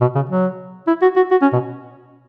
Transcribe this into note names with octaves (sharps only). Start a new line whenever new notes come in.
B2
C#3
F#3
E4
F#4
F#4
F#4
C#4
B2